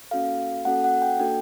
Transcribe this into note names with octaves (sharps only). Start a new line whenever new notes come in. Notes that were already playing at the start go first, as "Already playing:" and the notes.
A#3 C#4 F#4 A4 F5
A#3 C#4 F#4 A4 F#5
F#5
G5
A#3 D4 F#4 A4 G5